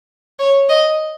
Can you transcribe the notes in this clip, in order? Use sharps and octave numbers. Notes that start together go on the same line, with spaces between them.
C#5
D#5